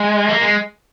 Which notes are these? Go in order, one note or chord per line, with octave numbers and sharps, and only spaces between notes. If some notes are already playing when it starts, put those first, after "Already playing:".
Already playing: G#3
A#3
G#3